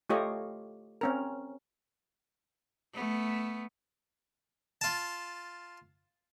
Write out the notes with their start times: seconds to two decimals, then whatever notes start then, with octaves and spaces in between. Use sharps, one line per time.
0.10 A3 F4 G4 C#5 D#5
1.01 C4 C#4 A#4
2.94 A3 B3
4.81 F4 A5